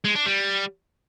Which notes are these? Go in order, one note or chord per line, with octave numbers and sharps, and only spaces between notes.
G#3
D4
G3